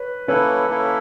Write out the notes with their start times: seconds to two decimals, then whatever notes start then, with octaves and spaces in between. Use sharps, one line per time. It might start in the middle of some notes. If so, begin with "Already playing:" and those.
Already playing: B4 C#5
0.28 A#3 C#4 E4 A4 B4 C#5
0.69 A#3 C#4 E4 A4